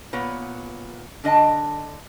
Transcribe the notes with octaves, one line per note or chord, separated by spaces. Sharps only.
A#2 B3 B4 C#5
D3 D4 D#5 G5 A5